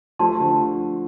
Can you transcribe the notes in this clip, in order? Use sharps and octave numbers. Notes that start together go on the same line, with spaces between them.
F3 A3 G4 D5 A5 C6
D3 F3